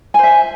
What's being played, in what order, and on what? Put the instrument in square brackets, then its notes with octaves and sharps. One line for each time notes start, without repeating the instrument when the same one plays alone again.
[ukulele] G#5
C5
E5